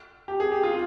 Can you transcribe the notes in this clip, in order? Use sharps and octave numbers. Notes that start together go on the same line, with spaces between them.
G4
G#4
G4
F4